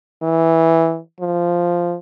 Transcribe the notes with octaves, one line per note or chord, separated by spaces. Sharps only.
E3
F3